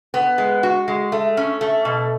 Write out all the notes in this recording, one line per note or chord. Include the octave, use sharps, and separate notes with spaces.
B3
G#3
F#4
G#3
A3
C#4
A3
B2